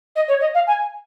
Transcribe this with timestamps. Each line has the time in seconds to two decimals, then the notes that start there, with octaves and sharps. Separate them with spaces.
0.15 D#5
0.28 C#5
0.40 D#5
0.54 F5
0.67 G#5